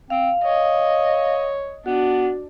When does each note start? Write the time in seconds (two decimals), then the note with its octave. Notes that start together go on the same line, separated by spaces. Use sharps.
0.10 C4 F5
0.44 C#5 D#5
1.86 B3 D4 F#4